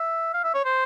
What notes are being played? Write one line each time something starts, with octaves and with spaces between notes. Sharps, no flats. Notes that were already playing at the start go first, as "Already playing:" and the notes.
Already playing: E5
F5
E5
C#5
C5